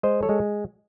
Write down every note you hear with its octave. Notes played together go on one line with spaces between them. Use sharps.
G#3 C5 D#5
A4 C#5
G#3